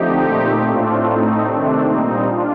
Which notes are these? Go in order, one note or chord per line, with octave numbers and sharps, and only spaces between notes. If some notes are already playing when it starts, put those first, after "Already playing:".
Already playing: D3 F3 A3 C4 D#4 G4
A#2 A3 C4
A2 A3 C4 D4 F4
A2 A3 C4 D#4
C3 D#3 A3 C4 D4
A#2 G3 C4 D#4
D4 F4